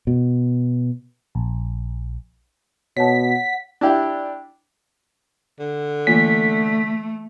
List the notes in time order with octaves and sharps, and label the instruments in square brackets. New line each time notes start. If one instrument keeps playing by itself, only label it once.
[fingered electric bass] B2
[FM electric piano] A#1
[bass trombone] B2 [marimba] C#5 A5 [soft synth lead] F#5 [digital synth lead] B6
[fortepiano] D4 E4 G4
[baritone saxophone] D3
[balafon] E3 A#3 F4 [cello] A3 [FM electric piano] B6